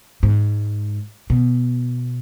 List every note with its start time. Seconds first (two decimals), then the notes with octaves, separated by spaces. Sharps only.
0.23 G#2
1.30 B2